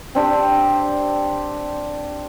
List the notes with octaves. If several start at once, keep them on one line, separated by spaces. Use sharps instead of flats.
C4 D4 G4